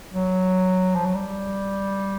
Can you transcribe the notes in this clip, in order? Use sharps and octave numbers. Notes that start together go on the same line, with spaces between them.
F#3
F3
F#3
G3